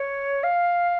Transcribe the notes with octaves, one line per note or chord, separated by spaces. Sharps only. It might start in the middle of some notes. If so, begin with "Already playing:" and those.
Already playing: C#5
F5